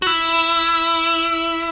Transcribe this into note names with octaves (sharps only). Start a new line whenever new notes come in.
F#4
E4